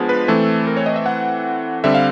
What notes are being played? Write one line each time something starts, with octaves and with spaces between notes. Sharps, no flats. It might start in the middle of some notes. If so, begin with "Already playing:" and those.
Already playing: F3 G#3 B3 D4
B4
E3 A3 C4 A4
A#4
C#5
D#5
E5
F#5
D3 G3 C4 E5
F5